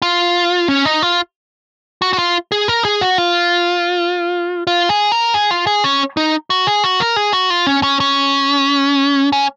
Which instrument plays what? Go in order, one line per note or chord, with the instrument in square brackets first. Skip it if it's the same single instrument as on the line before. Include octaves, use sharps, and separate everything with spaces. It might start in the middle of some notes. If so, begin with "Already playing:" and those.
[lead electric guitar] F4
C#4
D#4
F4
F#4
F#4
F4
G#4
A#4
G#4
F#4
F4
F4
G#4
A#4
G#4
F4
G#4
C#4
D#4
F#4
G#4
F#4
A#4
G#4
F#4
F4
C#4
C#4
C#4
C#4